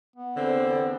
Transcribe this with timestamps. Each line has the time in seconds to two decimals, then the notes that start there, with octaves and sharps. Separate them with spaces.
0.16 B3
0.37 E2 D3 C4